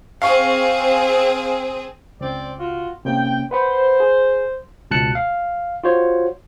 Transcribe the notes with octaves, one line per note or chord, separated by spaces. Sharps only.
C4 G#4 F5 C#6
C#2 C4 D5
F4 F#4
C3 A#3 C#4 G5
B4 C5 F#5 B5
G#4
C#2 B2 A5 F#6 C#7
F5
F4 F#4 C5 C#5